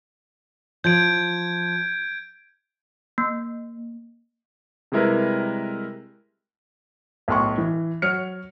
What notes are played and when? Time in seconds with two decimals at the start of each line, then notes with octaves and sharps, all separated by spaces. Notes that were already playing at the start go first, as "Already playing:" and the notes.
0.84 F3 G6 G#6 D7
3.18 A#3
4.92 C3 G3 G#3 E4 A#4 B4
7.28 B1 A2 C6 C#6
7.58 E3
8.02 F#3 C#5 F6 C#7